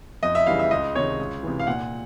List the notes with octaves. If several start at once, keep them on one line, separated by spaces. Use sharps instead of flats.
F2 D#5
E5
C#3 E3 G3 F5
E5
C#2 D#5
C3 D#3 G#3 C#5
C#2
C3 E3
F5
A#2 F#5